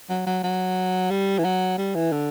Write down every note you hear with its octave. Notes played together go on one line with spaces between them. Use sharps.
F#3
F#3
F#3
G3
E3
F#3
G3
E3
D3